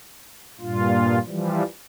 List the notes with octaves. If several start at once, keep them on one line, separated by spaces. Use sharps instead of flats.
G2 A#2 F4
E3 F3 G3